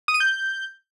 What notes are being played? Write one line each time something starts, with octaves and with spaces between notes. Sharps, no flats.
D#6
D#7
G6